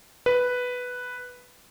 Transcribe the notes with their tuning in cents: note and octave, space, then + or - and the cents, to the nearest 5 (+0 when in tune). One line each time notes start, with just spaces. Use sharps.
B4 +0